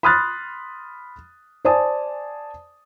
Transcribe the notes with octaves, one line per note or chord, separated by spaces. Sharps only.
B5 C6 D#6 F6 F#6 A6
C5 D5 G#5 A5 D#6